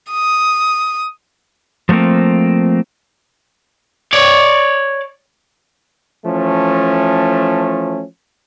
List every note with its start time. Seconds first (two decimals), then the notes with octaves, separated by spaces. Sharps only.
0.11 D#6
1.89 F3 F#3 A3 A#3 C4
4.13 C#5 D5
6.25 E3 F3 A3 C#4